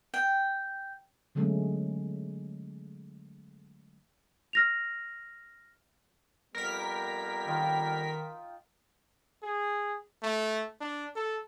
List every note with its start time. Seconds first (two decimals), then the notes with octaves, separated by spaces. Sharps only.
0.14 G5
1.35 D3 F#3 G#3 A3 B3 C#4
4.53 F6 A#6 F7
6.55 F2 G3 B3 A#4 B6
7.47 D#3 D#4 F4 G5
9.43 G#4
10.23 A3
10.81 D4
11.16 A4